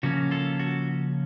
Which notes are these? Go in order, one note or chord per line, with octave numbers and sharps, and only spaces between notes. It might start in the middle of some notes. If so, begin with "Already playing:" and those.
C#3 F3 A#3 C#4 F#4
F4 A4
F#4